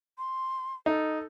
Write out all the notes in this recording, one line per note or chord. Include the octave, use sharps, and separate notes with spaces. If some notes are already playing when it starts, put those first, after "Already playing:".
C6
D#4 A4